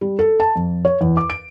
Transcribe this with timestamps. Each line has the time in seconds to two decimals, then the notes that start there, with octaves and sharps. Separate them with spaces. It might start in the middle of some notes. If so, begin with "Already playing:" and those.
0.01 G3
0.19 A4
0.40 A5
0.56 F2
0.85 C#5
1.01 E2
1.17 D6
1.30 D7